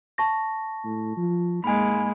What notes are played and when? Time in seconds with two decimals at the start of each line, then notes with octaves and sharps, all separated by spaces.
0.18 A5 C#6 A#6
0.84 A2
1.17 F3
1.64 G#2 G#3 A#3 G#5 B5